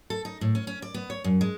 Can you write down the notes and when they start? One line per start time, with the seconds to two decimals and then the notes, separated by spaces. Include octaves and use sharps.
0.10 A4
0.25 D#4
0.41 A2
0.55 C#4
0.67 C#4
0.82 D5
0.94 B3
1.10 C#5
1.24 F#2
1.41 G#3